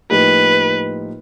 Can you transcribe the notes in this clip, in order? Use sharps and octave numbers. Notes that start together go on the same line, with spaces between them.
A2 F3 A#3 D#4 G4 B4